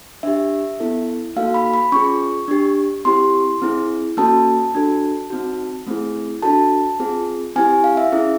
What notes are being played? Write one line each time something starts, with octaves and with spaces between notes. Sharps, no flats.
D4 G4 E5
B3 E4 A4
A#3 D#4 F#4 A4 F5
B5
B5
C#4 F4 G#4 C#6
D4 G4
C4 E4 G4 C6
C4 E4 G#4
A#3 C#4 F#4 A4 A5
D4 F#4 A4
C4 D#4 F#4
A3 C4 E4 G#4
D4 F#4 A4 A5
C4 F4 G#4
C4 E4 G4 G#5
F5
E5
C#4 E4 G#4